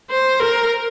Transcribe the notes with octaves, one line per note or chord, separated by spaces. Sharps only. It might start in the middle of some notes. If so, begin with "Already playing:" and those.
C5
A#4